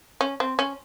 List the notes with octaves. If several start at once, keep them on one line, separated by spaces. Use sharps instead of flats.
C#4
C4
C#4